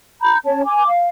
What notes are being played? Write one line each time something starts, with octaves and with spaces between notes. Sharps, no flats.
A#5 B5 G6
C#4 C#5 A5
G#5 D6
F5